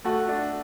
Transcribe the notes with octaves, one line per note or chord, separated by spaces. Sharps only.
A3 F#4
D4